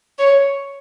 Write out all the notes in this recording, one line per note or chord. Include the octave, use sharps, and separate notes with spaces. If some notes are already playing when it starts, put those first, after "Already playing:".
C#5